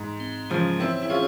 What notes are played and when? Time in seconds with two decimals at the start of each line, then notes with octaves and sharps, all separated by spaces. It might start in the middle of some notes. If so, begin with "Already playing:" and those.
Already playing: G#2
0.20 C4
0.50 C#3 F3 G#3
0.80 C4 E4 C#5
1.02 E4
1.10 C#4 F4 G#4